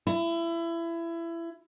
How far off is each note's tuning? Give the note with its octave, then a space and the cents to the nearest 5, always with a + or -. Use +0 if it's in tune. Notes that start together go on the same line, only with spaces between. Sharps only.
E4 +25